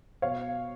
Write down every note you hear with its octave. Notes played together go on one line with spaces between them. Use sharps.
B2 C#5 F5